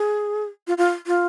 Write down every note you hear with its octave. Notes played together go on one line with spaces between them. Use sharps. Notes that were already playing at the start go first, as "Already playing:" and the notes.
Already playing: G#4
F4
F4
F4